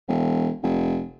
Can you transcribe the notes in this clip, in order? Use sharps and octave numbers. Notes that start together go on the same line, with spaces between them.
E1
F1